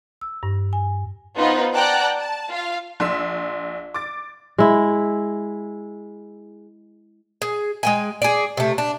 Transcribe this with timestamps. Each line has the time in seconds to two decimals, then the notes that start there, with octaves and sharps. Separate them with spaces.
0.21 E6
0.43 G2
0.73 G#5
1.36 B3 D#4 F4 B4 C5
1.74 D5 F#5 G5 A5 A#5 F#6
2.18 A5
2.50 F4 F5
3.00 A#1 C6 E6 B6
3.94 D6 A6
4.58 G#3 E4
7.42 G#4
7.83 G#3 G5 G#5
8.22 G#4 D5
8.57 C3 A3
8.78 D4